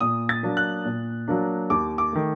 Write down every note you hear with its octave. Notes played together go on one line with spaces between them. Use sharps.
A#2 D#6
A6
F#3 A#3 D4
F#6
A#2
F#3 A#3 D4
D#2 D6
D6
D#3 A3